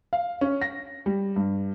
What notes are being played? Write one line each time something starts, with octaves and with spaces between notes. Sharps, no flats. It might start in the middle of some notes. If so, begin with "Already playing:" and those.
F5
C#4
A#6
G3
G2